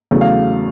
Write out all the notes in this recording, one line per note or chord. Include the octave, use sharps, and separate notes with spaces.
E2 C#3 F#3 A3
F5